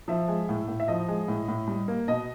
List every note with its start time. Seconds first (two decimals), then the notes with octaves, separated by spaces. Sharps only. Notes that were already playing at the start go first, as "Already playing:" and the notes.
0.08 F3 E5
0.28 G#3
0.49 A2
0.68 A2
0.80 E5
0.88 F3 D#5
1.08 G#3
1.28 A2
1.48 A2
1.68 G3
1.88 A#3
2.08 B2 D#5